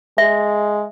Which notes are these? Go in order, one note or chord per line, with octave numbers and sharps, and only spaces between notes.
G#3 E5